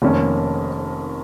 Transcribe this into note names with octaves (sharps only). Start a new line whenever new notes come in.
F1 F2 D#3 A#3 C#4